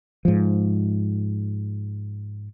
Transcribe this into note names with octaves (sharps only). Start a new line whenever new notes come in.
G#2 F3